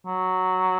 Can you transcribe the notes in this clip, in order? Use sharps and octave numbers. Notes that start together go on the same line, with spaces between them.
F#3